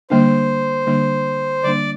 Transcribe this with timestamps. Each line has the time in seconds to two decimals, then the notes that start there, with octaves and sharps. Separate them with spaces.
0.10 D3 G3 A#3 D4 C5
0.87 D3 G3 A#3 D4
1.64 D3 G3 A#3 D4 D5